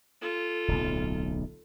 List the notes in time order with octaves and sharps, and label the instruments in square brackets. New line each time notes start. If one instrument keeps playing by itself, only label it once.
[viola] F4 A4
[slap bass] D1 B1